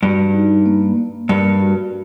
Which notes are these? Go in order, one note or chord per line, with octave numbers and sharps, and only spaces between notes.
G2 F#4
D#4
A#3
A#3
G2 A#4
F#4